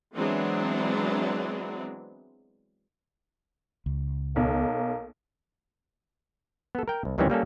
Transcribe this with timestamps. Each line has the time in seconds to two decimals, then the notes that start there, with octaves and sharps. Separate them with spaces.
0.15 E3 F#3 G#3 B3 C4 D4
3.86 C#2
4.36 B1 A#3
6.75 B3 A4
6.88 A#4 G5
7.05 C2
7.18 D2 D#3 E3 G3 C4 C#4
7.30 G3 A#3 C#4 A4